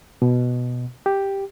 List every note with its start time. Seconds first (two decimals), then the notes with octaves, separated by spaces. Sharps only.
0.22 B2
1.06 G4